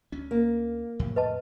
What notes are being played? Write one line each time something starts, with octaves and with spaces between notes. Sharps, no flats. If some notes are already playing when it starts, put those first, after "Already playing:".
D2 C#4
A#3
F2 A2 C3
B4 D#5 A5